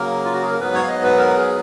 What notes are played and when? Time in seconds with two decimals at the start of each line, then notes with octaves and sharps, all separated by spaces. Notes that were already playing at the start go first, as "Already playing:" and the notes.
Already playing: C#3 F#3 A#3 A#4
0.24 F4
0.33 F#4
0.42 G#4
0.51 A#4
0.60 G#2 F#3 B3 B4
0.74 C#5
0.83 F5
0.88 D#5
1.03 B4
1.18 A#4
1.36 G#4